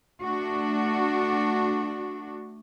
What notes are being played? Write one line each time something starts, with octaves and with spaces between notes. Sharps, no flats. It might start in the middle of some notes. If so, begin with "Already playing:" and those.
A3 D4 F#4